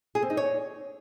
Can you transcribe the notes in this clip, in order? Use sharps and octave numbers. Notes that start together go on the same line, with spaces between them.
G#4
C4
D#4
C#5